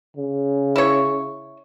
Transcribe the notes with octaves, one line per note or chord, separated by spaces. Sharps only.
C#3
E4 C#5